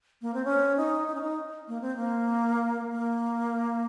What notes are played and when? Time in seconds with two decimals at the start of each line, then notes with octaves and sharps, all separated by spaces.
0.22 A#3
0.34 C4
0.45 C#4
0.77 D#4
1.07 D#4
1.15 C#4
1.21 D#4
1.68 A#3
1.81 C4
1.96 A#3
2.91 A#3